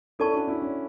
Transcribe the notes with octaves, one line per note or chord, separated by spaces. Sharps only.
C#4 E4 A4 D5 A5 C#6
D4 F#4
C#4 E4
C#4